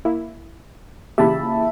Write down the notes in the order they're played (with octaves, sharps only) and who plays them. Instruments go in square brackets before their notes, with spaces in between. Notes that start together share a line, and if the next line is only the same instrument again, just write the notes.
[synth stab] A#3 E4
[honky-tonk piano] A#2 C#3 E3 [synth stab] G4 [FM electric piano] E5 A5 B5